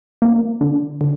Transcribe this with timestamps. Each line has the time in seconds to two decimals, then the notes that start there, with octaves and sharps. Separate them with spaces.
0.22 A#3
0.61 D3
1.01 D3